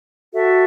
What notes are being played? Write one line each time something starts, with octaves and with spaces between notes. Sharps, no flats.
F#4 A4 E5